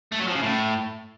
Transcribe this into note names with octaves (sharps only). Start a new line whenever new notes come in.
A3
F#3
F3
C#3
A2